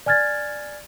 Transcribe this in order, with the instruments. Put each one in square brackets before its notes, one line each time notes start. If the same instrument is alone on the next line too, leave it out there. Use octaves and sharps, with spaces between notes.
[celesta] D5 G#5 F6 G#6 A6